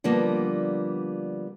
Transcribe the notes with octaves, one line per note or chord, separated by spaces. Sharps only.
D3 F3 G3 A#3 B3